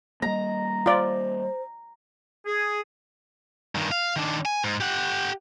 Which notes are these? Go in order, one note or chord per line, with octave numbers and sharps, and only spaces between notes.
G3 A#3 D#5 A#5
F4 C5 D5
G#4
G2 D#3
F5
D#3 D4
G#5
G#2
G4 F#5